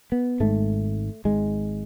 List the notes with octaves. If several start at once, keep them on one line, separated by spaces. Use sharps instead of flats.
B3
G#1 G#2 A3
G#1 G#2 G#3